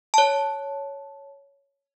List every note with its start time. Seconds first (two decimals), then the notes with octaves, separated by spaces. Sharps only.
0.14 C#5 A5